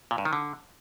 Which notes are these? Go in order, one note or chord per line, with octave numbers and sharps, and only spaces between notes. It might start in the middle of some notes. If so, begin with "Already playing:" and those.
A#2
G2
D#3
D3